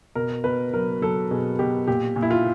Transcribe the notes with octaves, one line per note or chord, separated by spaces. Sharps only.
B2 A#4
B2 B4
F#3 A#4
F#3 A4
B2 G#4
B2 G4
A#2 G4
A#2
E4
F4